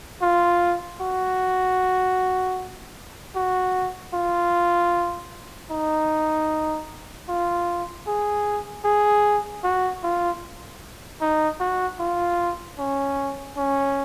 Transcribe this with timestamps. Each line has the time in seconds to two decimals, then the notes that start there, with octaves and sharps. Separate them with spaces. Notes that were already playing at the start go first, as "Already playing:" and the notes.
0.22 F4
1.01 F#4
3.35 F#4
4.14 F4
5.71 D#4
7.29 F4
8.07 G#4
8.85 G#4
9.64 F#4
10.04 F4
11.21 D#4
11.60 F#4
12.00 F4
12.78 C#4
13.57 C#4